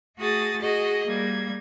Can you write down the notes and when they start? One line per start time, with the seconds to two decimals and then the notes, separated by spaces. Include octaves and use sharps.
0.19 A3 F#4 G#4 D#6 A6
0.60 F#4 G#4 D#5
1.06 G3 A#3 G#6